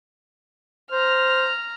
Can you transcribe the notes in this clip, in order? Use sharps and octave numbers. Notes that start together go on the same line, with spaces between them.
C5 A#5 F6